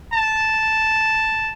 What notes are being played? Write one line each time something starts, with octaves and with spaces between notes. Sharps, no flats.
A5